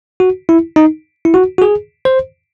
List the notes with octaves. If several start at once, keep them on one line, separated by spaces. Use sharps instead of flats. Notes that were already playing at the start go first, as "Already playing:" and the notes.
F#4
E4
D#4
E4
F#4
F#4
G#4
C5